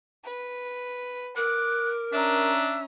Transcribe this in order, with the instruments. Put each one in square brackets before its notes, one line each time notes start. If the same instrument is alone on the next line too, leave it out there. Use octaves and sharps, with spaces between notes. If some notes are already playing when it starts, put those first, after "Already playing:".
[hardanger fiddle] B4
[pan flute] A#4 [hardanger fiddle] D6 [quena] F#6
[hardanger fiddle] C#4 A#5 [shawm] D4 [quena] E5